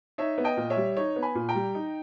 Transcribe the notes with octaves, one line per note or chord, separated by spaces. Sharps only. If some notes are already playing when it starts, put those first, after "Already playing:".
D#4 C#5 E5
B3
D#5 G5
A#2
C#5 E5
G3
D#4 C#5
B3
G#5 B5
A#2
G5 A#5
G3
D#4